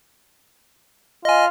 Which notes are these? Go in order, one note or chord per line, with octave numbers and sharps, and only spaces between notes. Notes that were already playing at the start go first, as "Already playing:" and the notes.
F4 D#5 G#5